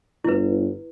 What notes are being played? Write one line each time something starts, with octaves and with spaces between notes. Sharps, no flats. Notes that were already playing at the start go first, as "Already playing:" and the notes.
G1 E4 B4